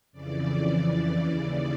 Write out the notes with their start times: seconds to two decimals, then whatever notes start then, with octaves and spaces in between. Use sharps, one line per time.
0.12 F2 C#3 E3 D5
1.13 D#2 C#3 E3 D5